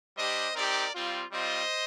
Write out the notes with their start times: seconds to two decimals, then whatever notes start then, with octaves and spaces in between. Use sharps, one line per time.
0.17 G3 D4 G4 C5 D#5
0.55 C4 D#4 G4 A#4 D5
0.94 G3 C4 F4
1.32 G3 C4 F4 C5 D#5